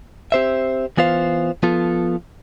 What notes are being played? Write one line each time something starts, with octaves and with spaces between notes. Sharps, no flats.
C4 G4 C5 E5
E3 B3 F4 C5 F5
F3 B3 F4 A4